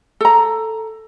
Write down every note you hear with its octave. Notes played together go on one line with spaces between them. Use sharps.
A4 A#5